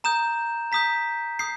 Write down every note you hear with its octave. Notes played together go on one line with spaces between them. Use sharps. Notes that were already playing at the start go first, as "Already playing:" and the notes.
A#5 D#6 G6 E7
A#5 D#6 G6 B6
D#6 G6 C7